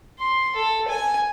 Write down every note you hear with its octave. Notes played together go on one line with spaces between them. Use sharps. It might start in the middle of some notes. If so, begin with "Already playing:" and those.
C6
A4
G#5